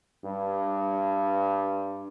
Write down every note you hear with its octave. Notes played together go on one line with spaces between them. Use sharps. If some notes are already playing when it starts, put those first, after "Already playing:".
G2